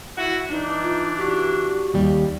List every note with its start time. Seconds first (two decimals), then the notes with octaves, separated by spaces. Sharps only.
0.17 E4 F#4
0.50 E3 D4 D#4
0.82 F4
1.18 F#4 G4
1.94 D#2 G3